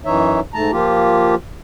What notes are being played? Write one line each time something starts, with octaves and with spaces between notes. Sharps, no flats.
F#2 E3 D#4 C#5 E5
G#2 A3 A5 A#5
F3 A#3 F4 G4